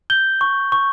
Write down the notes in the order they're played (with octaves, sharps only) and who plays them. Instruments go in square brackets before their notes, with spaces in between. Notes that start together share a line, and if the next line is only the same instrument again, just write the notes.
[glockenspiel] G6 G7
C#6
C#6